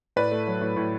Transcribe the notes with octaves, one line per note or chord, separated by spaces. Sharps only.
A2 B4 D5
A3
F#3
A2
A2